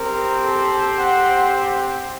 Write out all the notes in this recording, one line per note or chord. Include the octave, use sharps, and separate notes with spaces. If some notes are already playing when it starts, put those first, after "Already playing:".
Already playing: C4 G4 A#4
A4
F#5